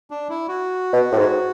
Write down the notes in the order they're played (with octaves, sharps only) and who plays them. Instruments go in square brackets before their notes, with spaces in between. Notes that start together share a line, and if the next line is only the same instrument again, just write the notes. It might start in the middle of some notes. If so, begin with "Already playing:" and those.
[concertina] D4
E4
F#4
[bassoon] B2
A2
G#2